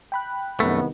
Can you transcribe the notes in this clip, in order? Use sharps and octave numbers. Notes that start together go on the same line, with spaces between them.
G5 B5 F#6
C2 F#2 D#3 A3 B3